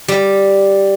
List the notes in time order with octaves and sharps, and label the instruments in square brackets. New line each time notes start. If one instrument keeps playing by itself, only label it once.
[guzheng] G3